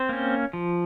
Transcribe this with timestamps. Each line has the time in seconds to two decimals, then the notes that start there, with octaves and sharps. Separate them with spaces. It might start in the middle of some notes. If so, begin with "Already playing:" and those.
Already playing: C4 C5
0.09 A#3 C#4
0.53 F3